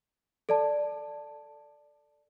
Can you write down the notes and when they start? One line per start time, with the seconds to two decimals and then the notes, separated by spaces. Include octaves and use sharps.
0.49 A4 D5 A5